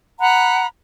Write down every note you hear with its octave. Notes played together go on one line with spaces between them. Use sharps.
F#5 A#5 B5 F#6